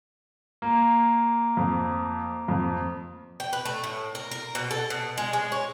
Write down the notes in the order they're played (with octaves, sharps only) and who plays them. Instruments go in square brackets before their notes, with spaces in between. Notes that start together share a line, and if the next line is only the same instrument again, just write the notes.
[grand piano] A#3
[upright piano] F2
F2
[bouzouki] G5
B4
A3
A2
A#4
A#4
B2
A4
B2
G#3
G#3
C#4